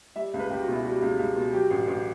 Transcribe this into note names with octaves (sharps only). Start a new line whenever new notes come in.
G3 E5
C#2
B4
C#2 G4
F#4
B2 E4
G3 F#4
C#2
C#2
B2
F#3 G4
A1
A1